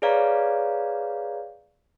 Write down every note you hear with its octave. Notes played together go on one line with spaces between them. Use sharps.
G#4 B4 C#5 D5 F5 A#5